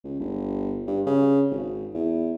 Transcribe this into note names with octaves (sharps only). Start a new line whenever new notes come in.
C#2
G1
G2
C#3
G#1
E2